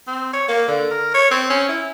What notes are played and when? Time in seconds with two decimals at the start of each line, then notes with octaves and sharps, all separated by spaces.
0.07 C4
0.33 C#5
0.48 A#3
0.68 D3
0.91 A#4
1.14 C#5
1.31 C4
1.50 C#4
1.69 E4